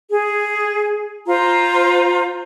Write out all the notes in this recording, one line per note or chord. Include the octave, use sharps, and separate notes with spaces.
G#4
F4 C5 A#5